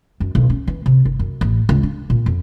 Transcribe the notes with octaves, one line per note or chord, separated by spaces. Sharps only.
F#2
B1
C#4
E3
C3
G1
F#2
A1
C#2
D4
A#2
F2